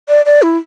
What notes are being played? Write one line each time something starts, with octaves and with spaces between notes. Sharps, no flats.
D5
D5
E4